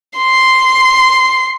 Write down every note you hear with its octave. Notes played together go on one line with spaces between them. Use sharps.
C6 C7